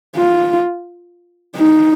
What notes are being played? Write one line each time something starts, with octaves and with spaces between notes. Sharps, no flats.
F4
D#4